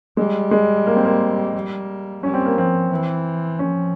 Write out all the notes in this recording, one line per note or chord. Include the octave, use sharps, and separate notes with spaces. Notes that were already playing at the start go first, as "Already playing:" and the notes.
G3 G#3
G#3
A#3
C4
A#3
G3
G3 C#4
C4
A#3
F3 C4
E3
F3 C#4